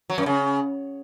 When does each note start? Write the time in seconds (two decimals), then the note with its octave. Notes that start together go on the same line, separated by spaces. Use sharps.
0.10 F#3
0.18 F#2
0.26 C#3